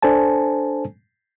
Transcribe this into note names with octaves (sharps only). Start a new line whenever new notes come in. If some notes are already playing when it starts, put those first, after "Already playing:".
D4 A4 C5 G#5 A5